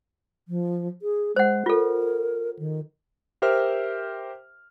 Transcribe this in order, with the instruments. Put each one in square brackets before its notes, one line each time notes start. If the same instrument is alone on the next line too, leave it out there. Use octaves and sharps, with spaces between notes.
[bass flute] F3
G#4
[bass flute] G#3 [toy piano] C5 F#5
[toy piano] F4 A4 [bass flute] A#4
[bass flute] D#3
[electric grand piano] G4 A#4 C5 E5 G5 F6